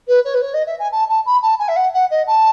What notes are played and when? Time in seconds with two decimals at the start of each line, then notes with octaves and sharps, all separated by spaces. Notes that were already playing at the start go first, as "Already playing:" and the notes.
0.08 B4
0.25 C#5
0.34 B4
0.42 C#5
0.54 D#5
0.67 E5
0.79 G#5
0.92 A5
1.09 A5
1.26 B5
1.43 A5
1.59 G#5
1.68 E5
1.76 F#5
1.94 F#5
2.11 D#5
2.27 A5